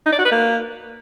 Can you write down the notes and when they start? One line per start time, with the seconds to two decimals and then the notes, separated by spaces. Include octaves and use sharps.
0.06 D#4
0.12 D5
0.18 F#4
0.25 B4
0.31 A#3